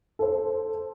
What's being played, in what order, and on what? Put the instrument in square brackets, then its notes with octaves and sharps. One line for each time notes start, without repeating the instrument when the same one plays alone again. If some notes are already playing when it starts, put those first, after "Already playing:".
[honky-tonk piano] A4 C5